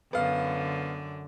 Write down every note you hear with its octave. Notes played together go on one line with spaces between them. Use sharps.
F#2 D3 B3 F5